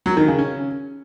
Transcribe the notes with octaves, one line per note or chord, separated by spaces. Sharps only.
F#3
D#3
C#3
C#4